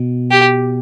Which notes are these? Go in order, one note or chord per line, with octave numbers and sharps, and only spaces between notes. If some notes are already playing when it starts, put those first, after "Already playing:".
Already playing: B2
G4